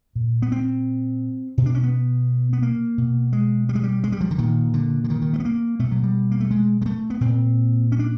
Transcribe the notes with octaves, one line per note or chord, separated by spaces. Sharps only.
A#2
B3
C4
B2
D4
C#4
B3
B3
A#3
B2
G#3
G3
G#3
G3
G#3
G3
F3
D3
A#2 D#3
D3
D3
D#3
D#3
A3
B3
A#3
B2 A3
F#3
G3
A#3
A3
G#3
G#3
A3
B3
A#2 C4
C#4
D4